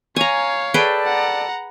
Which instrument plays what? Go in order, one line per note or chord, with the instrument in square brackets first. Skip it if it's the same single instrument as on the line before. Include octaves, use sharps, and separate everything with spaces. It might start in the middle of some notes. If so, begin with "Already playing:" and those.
[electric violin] C#5 F5 [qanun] G#5 A#5
[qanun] G#4 B4 G5 [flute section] A4 D5 A5
[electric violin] F#5 A#5